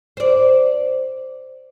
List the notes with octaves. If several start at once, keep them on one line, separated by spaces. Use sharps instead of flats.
C5 D5